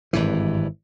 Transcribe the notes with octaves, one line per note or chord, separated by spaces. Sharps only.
G#1 G2 E3